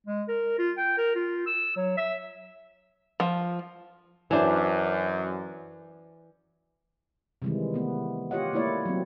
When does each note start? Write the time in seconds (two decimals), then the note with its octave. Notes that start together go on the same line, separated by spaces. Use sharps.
0.07 G#3
0.28 A#4
0.59 F4
0.77 G5
0.98 A#4
1.15 F4
1.47 E6
1.76 F#3
1.97 E5
3.20 F3
4.31 F#2 E3 D4 C5
7.42 C3 D#3 E3 G3 G#3
7.74 A3 B3
8.31 F4 G4 C#5 D#5 F#5
8.53 A3 A#3 E4 C#5 D5
8.85 F#3 C4